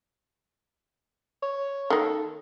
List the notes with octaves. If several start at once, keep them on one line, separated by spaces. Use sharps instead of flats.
C#5
D#3 A#3 A4